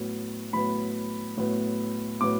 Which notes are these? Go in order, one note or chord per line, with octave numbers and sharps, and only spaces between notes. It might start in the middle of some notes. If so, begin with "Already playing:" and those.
Already playing: A2 F#3 B3
A2 F#3 B3 B5
A2 F#3 B3
A2 F#3 B3 D6